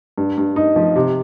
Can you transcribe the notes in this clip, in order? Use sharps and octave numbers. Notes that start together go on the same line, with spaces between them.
G2
G2
D#4
F3
C3